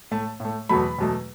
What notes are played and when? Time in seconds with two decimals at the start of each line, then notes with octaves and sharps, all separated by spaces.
0.11 A2 A3 A5
0.40 A2 A3
0.69 E2 B2 F#3 A3 B5
0.98 E2 B2 F#3 A3